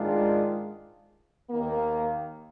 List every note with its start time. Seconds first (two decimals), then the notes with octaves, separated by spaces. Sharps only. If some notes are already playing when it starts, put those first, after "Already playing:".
Already playing: G#2 D#3 G#3 D4 F4
1.51 D#2 D#3 A#3